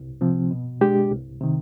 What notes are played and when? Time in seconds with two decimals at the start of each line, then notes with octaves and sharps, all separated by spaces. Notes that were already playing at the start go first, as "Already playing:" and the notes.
Already playing: C2
0.21 C3 F3 C4
0.51 B2
0.81 G#3 D4 G4
1.11 C2
1.41 C3 D#3